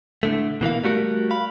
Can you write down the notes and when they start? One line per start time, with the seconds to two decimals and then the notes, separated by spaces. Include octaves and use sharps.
0.23 A2 D3 A3
0.61 B2 E3 A#3 F5
0.84 G3 A3 F#4 A#4
1.31 F5 B5